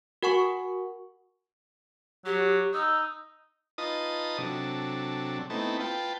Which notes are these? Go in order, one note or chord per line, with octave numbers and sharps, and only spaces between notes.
F#4 A#4 F#5 G#5 C#6
F#3 G4
D#4 E6
D#4 F4 B4 D#5 A5 D#6
C3 F#3 D4 A4
A3 B3 C4 D#4 E4 A4
F4 B4 G5 A5